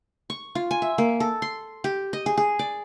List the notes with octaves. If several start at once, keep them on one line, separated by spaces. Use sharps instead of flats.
C#6
F4
G#5
E5
A#3
A4
C6
G4
D#5
G#4
G#4
D5